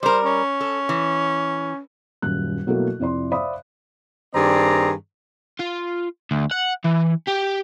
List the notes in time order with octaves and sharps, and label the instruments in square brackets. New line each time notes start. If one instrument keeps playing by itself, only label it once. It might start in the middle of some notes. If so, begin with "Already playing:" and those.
[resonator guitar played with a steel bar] G3 A#4 [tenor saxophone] C5
[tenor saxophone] C#4
[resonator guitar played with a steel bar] A4
E3
[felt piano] D#1 F#2 F#6
B2 F#3 A3 A#3 E4 A4
F2 C3 E4 D5 C6
C5 D5 E5 F5 B5 D#6
[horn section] G2 D#3 C4 G#4 D5 A#5
[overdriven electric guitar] F4
D2
F#5
E3
G4